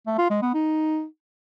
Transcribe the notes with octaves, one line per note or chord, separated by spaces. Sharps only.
A3
F4
G#3
B3
D#4